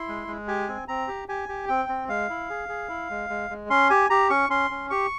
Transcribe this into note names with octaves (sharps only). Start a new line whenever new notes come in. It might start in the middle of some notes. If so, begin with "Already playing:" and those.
Already playing: E4 C6
G#3
G#3
G4 G#5
C4
C4 A#5
G4
G4 G#5
G4
C4 G5
C4
G#3 F5
E4
G#4
G#4
E4
G#3
G#3
G#3
C#4 C6
G4 G#5
G4 A#5
C#4 C#6
C#4 C6
C#4
G4 C#6